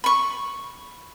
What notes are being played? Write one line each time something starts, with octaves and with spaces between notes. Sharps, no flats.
B5 C#6